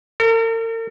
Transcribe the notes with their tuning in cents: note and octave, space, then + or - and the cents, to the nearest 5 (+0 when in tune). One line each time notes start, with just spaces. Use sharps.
A#4 -45